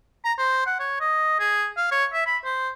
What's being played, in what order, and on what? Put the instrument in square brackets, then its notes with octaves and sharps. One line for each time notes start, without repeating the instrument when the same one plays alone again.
[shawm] A#5
C5
F#5
C#5
D#5
G#4
F5
C#5
E5
B5
C5